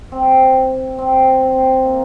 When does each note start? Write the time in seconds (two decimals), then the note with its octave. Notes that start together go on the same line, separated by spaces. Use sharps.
0.12 C4
0.98 C4
1.41 C4
1.84 A#3